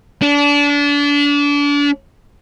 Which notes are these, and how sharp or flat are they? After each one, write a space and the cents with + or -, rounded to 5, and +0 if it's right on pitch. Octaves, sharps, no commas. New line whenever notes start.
D4 -30